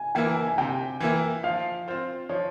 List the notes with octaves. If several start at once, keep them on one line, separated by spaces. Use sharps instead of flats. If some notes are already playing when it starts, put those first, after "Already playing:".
Already playing: G#5
E3 A#3 E4 G5
G#5
G#5
C3 G5
E3 A#3 E4
F3 F5
C4 F4 C5
F3 C#5